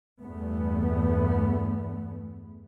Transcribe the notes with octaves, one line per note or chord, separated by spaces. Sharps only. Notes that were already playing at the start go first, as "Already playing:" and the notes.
E2 G2 A3 B3